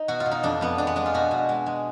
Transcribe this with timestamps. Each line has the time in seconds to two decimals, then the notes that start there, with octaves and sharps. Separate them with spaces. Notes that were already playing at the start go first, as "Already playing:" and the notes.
Already playing: D#4
0.08 B2 F#4
0.20 F4
0.26 B2
0.31 D#4
0.43 F2 D4
0.61 F2 B3
0.78 G#3 D4
0.87 B3
0.96 G#3 D4
1.06 F4
1.14 B2 F#4
1.31 B2
1.49 G#3
1.66 G#3